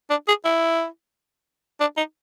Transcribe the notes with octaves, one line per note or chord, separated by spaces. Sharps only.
D4
G#4
E4
D4
D#4